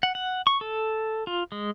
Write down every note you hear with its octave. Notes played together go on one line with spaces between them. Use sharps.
F#5
F#5
C#6
A4
F4
G#3